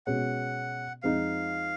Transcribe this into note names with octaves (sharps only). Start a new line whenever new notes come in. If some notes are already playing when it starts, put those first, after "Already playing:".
B2 G#3 C#4 F#5
F2 F3 G#3 D#4 F5